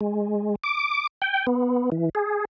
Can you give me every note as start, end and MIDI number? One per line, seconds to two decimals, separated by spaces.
0.01 0.55 56
0.64 1.07 86
1.22 1.46 79
1.47 1.90 59
1.92 2.09 52
2.15 2.45 68